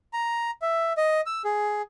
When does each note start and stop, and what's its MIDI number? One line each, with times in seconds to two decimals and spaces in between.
0.13 0.51 82
0.62 0.93 76
0.97 1.21 75
1.26 1.42 88
1.45 1.82 68